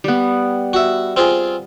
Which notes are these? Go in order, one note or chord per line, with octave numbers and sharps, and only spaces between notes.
G3 B3
F#4 E5
C4 F4 G#4